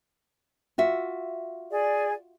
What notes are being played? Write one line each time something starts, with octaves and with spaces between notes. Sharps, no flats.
F4 F#4 E5
G#4 D5